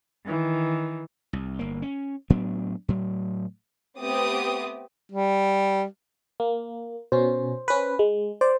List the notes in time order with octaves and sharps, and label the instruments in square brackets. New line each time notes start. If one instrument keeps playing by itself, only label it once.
[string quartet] D#3 E3
[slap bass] C2
G1 A#3
C#4
A2 F#3 B3 D4
A2 F#3
[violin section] A3 B3 C4 G4 D6 D#6
[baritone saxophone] G3
[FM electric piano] A#3
[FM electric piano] B2 C#4 [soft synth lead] C5
[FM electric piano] C#4 B4
G#3
[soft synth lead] C5 [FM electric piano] D5